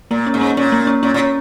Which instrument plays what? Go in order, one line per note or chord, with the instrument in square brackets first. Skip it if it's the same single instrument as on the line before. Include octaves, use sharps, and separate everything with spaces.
[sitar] A#2 [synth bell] A#3
[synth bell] C#4
[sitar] G#2
[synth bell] C#4
[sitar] A#2 [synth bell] C#4
[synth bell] A#3
C#4
[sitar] A#2 [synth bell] C#4
[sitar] A#2
[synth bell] C#4